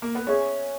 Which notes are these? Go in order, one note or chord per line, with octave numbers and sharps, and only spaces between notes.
A#3
B3
C#4 G#4 C#5 E5